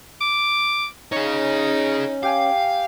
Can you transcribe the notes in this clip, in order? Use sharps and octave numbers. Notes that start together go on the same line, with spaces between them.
D6
C#4 D#4 G#4 C#5
G4 F5 G5 G#5